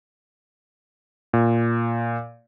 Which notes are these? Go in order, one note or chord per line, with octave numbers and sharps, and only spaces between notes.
A#2